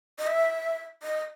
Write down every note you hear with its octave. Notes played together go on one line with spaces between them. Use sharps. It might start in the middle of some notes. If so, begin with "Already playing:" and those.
D#5
E5
D#5